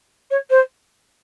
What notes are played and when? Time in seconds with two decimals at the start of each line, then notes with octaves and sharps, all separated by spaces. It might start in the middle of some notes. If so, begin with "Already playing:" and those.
0.30 C#5
0.50 C5